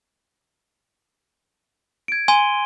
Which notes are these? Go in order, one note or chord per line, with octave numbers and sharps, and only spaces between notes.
G#6 D7
G#5 C6 D#7 G7